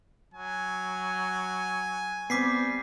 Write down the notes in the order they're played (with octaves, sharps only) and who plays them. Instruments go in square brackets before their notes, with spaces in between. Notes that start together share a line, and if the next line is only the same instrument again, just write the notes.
[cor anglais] F#3 [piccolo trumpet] G#5
[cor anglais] G3 [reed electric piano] B3 C4 [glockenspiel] D6 B6 C7